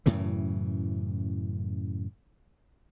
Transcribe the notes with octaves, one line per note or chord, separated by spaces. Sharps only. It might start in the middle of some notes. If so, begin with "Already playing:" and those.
F#2 A2 C#3 E3